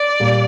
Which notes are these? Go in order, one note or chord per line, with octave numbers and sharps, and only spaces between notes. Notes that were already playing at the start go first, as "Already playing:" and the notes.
Already playing: D5
A#2 G3 A#3